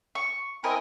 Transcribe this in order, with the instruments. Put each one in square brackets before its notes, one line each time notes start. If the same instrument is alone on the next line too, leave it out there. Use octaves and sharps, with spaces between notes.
[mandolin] C#6
[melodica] C4 E4 G#5 [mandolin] A#4 D#5